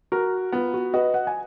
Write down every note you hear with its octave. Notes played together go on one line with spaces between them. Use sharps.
F#4 A#4
B3 F4
F#4
F#4 B4 D#5
F#5
G#5